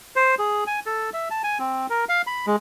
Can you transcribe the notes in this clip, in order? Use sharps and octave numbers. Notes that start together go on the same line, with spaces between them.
C5
G#4
G#5
A4
E5
A5
G#5
C4
A#4
F5
B5
G#3